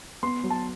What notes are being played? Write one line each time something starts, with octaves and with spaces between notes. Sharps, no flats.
B3 C6
F#3
A5